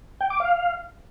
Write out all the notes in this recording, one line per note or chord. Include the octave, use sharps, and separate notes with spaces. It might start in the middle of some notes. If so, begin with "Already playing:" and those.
G5
D6
F5